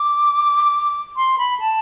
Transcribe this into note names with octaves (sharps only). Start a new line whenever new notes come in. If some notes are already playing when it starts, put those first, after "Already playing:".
Already playing: D6
C6
B5
A5